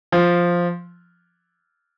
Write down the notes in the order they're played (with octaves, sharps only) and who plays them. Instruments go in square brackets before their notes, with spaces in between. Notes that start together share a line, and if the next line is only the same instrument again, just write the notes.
[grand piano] F3